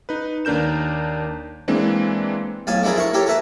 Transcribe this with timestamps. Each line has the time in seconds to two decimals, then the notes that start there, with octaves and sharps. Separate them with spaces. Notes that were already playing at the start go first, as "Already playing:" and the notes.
0.09 D#4 B4
0.45 D#2 D4 A#4 G6 E7
1.68 E3 G#3 A#3 C4 D4
2.67 B1 A2 F5 G#5 A5
2.83 D3 F3 D#4 E4 G#4 A#4
2.96 E4 A#4 F5 C#6
3.13 A#3 G4 A4 A#4 C#5
3.26 A#4 B4 E5 A5